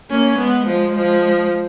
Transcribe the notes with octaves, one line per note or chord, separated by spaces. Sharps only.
A#3 C#4
G#3 B3
F3 G#3
F3 G#3